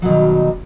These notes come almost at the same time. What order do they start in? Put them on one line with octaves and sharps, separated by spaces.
F#3 B2 D#3 G3